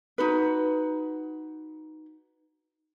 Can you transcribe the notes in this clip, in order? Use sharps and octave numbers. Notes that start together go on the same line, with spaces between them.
D#4 F#4 B4